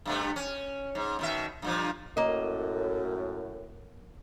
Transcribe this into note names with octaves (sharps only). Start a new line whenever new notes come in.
G2 C3 A3
C#4
G#2
B2 D#3 E5
G2 A#2 F3
F#2 A2 A#3 D#5